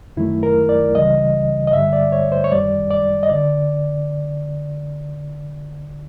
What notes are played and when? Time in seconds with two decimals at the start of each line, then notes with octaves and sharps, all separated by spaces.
0.17 F#2 D#3 F#3 A3 E4
0.43 A#4
0.69 D5
0.95 C#2 C#3 E3 G3 D#5
1.67 D#5
1.73 G2 D3 G3 E5
1.93 D5
2.12 C#5
2.32 C5
2.44 C#5
2.51 F#2 D#3 G3 D5
2.90 D5
3.23 D#5
3.29 D3 D5